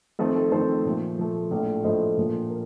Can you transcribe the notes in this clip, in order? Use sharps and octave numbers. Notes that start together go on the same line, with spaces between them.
F2 D#3 A3 C4 A4
A4
F2 D#3 A3 C4 A4 C5
A#2 F3 A3
A#2 F3 A3
A#1 A2 F3 A3
A#1 A2 F3 A3 C5 D#5
A#1 A#2 F3
A#4